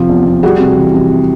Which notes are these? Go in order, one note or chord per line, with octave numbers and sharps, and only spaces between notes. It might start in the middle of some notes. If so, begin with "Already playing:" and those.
Already playing: C3 F3
E2
E2
G3 F#4 G#4
C3
E3
C3